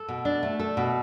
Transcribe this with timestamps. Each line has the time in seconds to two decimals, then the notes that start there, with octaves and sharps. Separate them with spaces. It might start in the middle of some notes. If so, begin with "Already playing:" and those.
Already playing: A4
0.08 B2
0.25 D4
0.43 A3
0.59 A4
0.77 B2